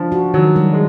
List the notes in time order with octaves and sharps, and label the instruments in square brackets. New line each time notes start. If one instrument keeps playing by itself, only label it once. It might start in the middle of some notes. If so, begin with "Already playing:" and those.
Already playing: [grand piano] F3 [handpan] D4
[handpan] F#4
[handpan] D#3 [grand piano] F#3
[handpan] G3
[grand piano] G#3